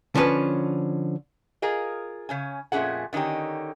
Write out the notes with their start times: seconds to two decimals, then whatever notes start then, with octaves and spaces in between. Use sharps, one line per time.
0.15 D3 F3 C#4 B4
1.62 F4 G#4 A#4 D#5
2.29 C#3 C#4 G#5
2.72 F2 A#2 A3 C#4 G#4 F#5
3.13 D3 D#3 C#4 D#4 G4